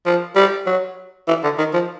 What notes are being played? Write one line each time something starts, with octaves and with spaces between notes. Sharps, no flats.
F3
G3
F#3
E3
D3
D#3
F3